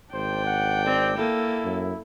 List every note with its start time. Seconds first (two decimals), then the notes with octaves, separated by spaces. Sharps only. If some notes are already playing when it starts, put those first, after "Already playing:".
0.14 G#1 D4 C5 G5
0.45 F#5
0.86 C4 D5
1.17 A#3 E4 A4
1.64 F#2